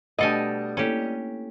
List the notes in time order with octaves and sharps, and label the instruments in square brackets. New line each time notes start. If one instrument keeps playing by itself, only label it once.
[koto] B2 A4 G#5 [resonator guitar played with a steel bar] G3 D#5 [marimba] A3 D4
[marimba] A#3 E4 A4 [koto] C#4 G4